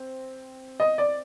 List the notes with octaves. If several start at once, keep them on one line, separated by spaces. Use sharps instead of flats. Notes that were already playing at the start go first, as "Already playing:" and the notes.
Already playing: C4
D#5
D5